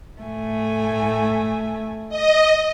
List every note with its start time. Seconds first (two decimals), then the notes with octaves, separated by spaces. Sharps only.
0.22 A2 A3 G#5
2.09 D#5